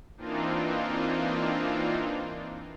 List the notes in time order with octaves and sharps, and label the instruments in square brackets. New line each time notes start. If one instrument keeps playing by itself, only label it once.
[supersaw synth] E3 A#3 C4 D4 D#4 F4